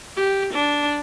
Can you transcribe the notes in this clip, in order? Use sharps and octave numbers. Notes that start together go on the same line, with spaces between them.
G4
D4